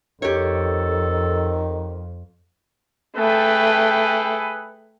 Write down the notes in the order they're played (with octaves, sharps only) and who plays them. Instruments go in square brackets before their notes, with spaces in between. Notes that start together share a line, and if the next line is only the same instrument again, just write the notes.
[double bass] F2 [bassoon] D#3 [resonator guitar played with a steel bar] G4 C#5 [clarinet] A4
[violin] A3 G5 [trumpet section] G#4 A4 B4